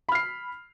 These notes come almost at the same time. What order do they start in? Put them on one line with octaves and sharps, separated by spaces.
B5 F6 C7